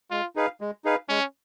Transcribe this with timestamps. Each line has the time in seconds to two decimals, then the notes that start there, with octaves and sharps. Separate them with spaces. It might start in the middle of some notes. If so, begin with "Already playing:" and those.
0.11 G#3 F4
0.36 D#4 G#4 B4 F5
0.61 G#3
0.85 D#4 G#4 B4 F5
1.09 G#3 C#4